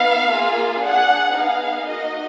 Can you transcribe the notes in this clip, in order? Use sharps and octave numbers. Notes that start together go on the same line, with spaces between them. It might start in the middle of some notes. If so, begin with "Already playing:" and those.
Already playing: B3 D#4 F5
A#3 F4 G#4
D4 G#4 F#5
B3 D#4 G#4 F5
A#3 D#4 F#4 D#5